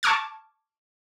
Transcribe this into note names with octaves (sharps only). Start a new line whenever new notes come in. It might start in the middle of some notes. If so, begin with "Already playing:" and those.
A5 C#6 D6 F6 G#6